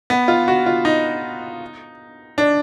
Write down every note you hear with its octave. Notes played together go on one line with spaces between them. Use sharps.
B3
F4
F#4
F4
D#4
D4